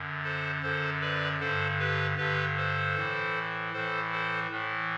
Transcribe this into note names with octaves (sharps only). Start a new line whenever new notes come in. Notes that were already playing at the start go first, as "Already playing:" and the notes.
Already playing: F#2 D3
A4 C5
F#2 D3 A4 C5
B4 D5
G2 D3 A4 C5
G4 B4
G2 D3 G4 B4
A4 C5
A2 E3
A2 E3 A4 C5
A4 C5
A2 E3